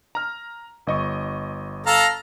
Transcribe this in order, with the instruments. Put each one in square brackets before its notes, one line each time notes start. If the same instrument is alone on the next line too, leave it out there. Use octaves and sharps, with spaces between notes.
[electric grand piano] A#5 F6
G1 D#5 C#6
[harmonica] A4 F5 A#5